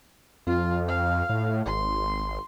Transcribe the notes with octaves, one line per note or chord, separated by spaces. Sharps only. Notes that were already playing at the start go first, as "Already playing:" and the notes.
F2 F4
F5
A2
G#1 C6